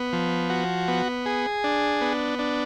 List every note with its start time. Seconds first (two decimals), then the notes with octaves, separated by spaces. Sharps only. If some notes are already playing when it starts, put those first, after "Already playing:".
Already playing: B3
0.13 F3
0.50 F#4
0.88 B3
1.26 G#4
1.64 D4
2.01 B3
2.39 D4